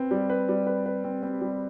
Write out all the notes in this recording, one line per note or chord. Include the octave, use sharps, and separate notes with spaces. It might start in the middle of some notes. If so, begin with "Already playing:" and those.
Already playing: C4 B4
G3
B4
G3
B4
B4
C4
C4
G3